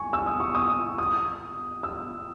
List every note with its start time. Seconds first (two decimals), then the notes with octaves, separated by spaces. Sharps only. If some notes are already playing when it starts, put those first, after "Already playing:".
Already playing: G#5 C#6
0.13 E6
0.26 D#6
0.40 C#6
0.55 D#6
0.98 D#6
1.83 E6